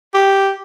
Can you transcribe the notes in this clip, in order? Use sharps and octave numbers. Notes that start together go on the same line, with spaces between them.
G4